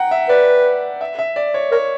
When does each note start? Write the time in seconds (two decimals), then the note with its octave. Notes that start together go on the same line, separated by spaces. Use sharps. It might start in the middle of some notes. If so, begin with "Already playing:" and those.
Already playing: F#5 G5 A#5
0.11 E5
0.29 B4 D5
1.01 E5
1.19 E5
1.36 D5
1.54 C#5
1.71 A#4 C#5